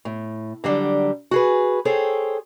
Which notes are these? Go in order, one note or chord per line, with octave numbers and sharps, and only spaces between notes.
A2
D3 F#3 G3 D4
F#4 G#4 B4
G#4 A4 C5 C#5 G5